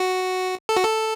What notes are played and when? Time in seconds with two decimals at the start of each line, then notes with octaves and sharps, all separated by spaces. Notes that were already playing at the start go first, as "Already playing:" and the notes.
Already playing: F#4
0.69 A4
0.77 F#4
0.84 A4